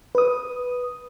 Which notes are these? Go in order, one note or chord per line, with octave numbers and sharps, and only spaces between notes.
B4 D#6